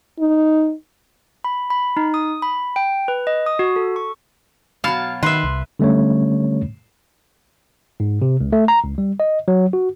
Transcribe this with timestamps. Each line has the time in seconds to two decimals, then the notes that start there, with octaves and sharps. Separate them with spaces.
0.19 D#4
1.44 B5
1.70 B5
1.97 D#4
2.14 D#6
2.42 B5
2.76 G5
3.08 B4
3.27 D#5
3.46 D#6
3.59 F#4
3.76 A4
3.96 C#6
4.84 B2 F#3 F5 A5 F6
5.23 D#3 B4 E5 C6
5.44 C2
5.79 D3 G3 A3 C#4 C#5
8.00 G#2
8.22 C3
8.41 C#2
8.53 A3
8.68 A#5
8.84 C#2
8.98 G3
9.20 D#5
9.48 F#3
9.73 F#4